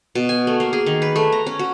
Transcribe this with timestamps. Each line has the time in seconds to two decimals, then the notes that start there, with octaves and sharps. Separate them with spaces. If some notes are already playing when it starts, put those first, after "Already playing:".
0.15 B2
0.29 G#5
0.47 A3
0.60 A#3
0.73 G#4
0.86 D#3
1.02 B4
1.16 A3
1.32 A#5
1.47 C#4
1.59 F#4